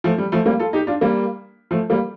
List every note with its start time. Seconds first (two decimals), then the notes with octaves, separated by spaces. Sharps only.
0.04 F3 A3
0.18 G3
0.32 F3 A3
0.46 G3 A#3
0.59 F4 A4
0.73 D#4 G4
0.87 D4 F4
1.01 G3 A#3
1.71 F3 A3
1.90 G3 A#3